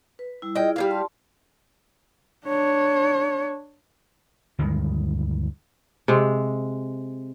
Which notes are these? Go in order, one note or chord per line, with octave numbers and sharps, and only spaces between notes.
B4
G3 E4
E4 F4 G#4 D#5 G5
G3 A#3 F5
D5 A5 C6
D4 C#5
D2 G2 D#3 G#3
C3 G#3